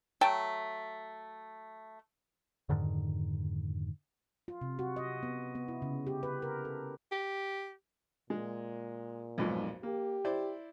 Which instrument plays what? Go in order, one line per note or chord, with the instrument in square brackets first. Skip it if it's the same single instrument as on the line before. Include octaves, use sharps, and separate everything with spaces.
[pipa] F#3 A3 G5 A5
[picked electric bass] F2 G#2 D3 D#3
[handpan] F4
C3
F#4
D#5
B3
B3
E4
C#3
G4
B4
A#4
A4
[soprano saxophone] G4
[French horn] A#2 [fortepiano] G#3
[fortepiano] B1 F2 G#2
[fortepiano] A#3 [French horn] G4
[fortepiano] E4 C5 D5